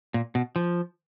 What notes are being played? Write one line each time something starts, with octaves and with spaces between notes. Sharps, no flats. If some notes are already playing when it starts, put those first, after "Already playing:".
A#2
B2
F3